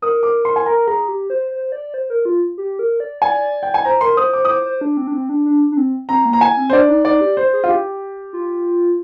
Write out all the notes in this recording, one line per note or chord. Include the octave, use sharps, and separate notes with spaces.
A#4 D#6
D6
C6
G#5
A#4 A#5
G#4 A#5
G4
C5
C5
D5
C5
A#4
F4
G4
A#4
D5
D5 G#5
G5
G#5
C5 A#5
A#4 C6
C5 D#6
C5 D6
D#6
C5 D6
C5
D4
C4
D4
C4
D4
D4
D4
C4
C4 A#5
A#3
A#5
G#5
C4
C5
D4 D5
D#4
D#4 D5
G4
C5
G#4
F4
G4
F4